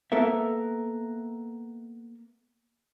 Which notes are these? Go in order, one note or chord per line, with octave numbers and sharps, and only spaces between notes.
A#3 B3 A4 A#4 E5